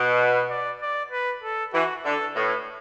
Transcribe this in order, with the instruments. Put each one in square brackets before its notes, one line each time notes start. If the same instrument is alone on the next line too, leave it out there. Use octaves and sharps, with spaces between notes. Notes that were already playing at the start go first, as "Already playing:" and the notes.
Already playing: [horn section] B2
[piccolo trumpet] B4
D5
D5
B4
A4
[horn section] E3 [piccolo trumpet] F#4
[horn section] D3 [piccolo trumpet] A4
[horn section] A2 [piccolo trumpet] B4